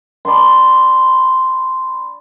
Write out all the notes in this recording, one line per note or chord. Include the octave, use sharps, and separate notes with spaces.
D5 A5 B5 C6